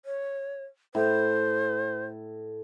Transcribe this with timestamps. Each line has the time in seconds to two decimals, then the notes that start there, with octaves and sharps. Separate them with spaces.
0.05 C#5
0.95 A2 C5